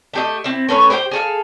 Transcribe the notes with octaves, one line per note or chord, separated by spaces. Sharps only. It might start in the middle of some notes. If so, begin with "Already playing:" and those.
A3 G4 D#5
C4 E4
A3 C#4 B4 C#5
G4 C5 D#5 G5
G#4 A4 F5